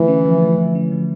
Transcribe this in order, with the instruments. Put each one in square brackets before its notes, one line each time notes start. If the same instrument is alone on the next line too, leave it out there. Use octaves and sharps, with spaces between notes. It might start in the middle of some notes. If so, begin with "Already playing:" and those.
Already playing: [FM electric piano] D3 A3 [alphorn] E3
[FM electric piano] C#4
F3
A3
D3
C#4
F3